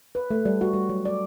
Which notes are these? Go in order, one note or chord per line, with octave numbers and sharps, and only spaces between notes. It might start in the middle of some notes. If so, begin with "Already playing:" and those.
B4
A3
G3
F#4
G3
F#3
D5